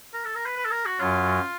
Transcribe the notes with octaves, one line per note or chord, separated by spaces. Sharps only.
A#4
A4
A#4
B4
B4
A4
A#4
F#4
F#2 F#3 F4